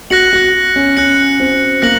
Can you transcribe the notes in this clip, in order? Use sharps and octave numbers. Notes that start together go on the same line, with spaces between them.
F#4 F#6 A#6 C#7 F#7
F#4
C#4
C#4 F#6 A#6 C#7 F#7
C4
A#3 F#6 A#6 C#7 F#7